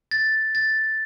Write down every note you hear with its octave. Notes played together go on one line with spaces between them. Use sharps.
A6
A6